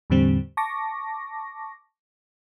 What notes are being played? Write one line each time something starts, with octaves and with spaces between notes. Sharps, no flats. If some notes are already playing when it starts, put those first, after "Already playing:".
E2 A2 D3 G3 C4
A5 C#6 D6 A#6